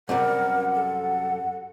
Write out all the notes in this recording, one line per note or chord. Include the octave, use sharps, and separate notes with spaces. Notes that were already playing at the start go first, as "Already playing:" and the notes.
F#2 C3 G3 A#4 F#5
A4